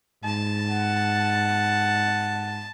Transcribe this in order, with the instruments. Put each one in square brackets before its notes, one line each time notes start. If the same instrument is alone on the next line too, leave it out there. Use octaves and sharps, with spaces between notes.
[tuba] G#2 [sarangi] A5
[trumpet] F#5